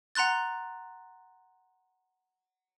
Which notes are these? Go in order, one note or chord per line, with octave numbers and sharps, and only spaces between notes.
F#5 A#5 C6 F#6 A6